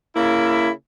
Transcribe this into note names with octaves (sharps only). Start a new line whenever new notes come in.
C#3 A#3 E4